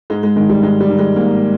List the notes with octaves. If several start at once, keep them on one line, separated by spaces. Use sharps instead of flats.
G#2 G#3
G#3
D#3 G#3
G3
G#2 G#3
G3
D#3
G#3
G#2 A#3